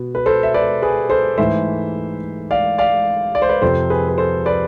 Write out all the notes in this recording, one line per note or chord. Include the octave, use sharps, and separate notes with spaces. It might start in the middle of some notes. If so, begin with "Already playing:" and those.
Already playing: B2 B3
B4
A4 C5
E5
B4 D5
G#4 B4
A4 C5
G#2 E3 A3 C5 E5
D5 F5
D5 F5
D5
C5
B4 D5
F2 C3 F3 A4 C5
G#4 B4
B4
A4 C5
B4 D5